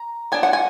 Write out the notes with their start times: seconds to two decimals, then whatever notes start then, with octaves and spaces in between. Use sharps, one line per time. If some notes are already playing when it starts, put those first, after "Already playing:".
Already playing: A#5
0.32 B3 D4 G#5
0.43 F#5
0.53 G#5